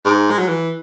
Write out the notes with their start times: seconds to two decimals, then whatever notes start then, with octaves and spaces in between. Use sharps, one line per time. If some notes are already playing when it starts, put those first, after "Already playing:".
0.05 G#2
0.31 G#3
0.39 F#3
0.48 E3